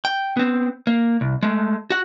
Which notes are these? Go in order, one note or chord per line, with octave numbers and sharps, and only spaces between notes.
G5
B3 C4
A#3
C2
G#3 A3
F#4 F#5